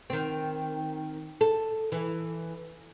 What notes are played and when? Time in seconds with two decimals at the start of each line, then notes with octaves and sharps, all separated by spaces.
0.10 D#3 C4
1.41 A4
1.92 E3